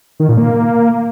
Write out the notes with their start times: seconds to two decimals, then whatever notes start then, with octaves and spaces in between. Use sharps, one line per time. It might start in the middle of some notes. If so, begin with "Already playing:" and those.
0.20 D#3
0.29 A#2
0.38 A#3